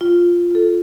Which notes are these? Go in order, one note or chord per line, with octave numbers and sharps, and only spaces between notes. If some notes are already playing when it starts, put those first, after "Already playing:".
F4
F4 A4